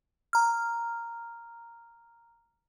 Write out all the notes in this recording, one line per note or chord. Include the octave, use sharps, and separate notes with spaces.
A#5 F6